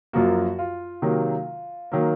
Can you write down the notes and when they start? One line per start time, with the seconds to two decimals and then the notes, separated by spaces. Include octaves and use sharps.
0.13 F#2 F3 A#3 F#4
0.59 F4
1.02 C3 D#3 F#3 A#3
1.92 D#3 F#3 A#3